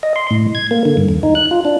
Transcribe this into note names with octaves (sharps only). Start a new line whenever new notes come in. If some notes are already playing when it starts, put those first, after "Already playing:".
D#5
C6
A2
G#6
A#3
D3
G2
D#2
D#4
F#6
F4
D4